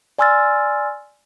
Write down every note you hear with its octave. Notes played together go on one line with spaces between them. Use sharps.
D5 G#5 C6 E6 F6 A6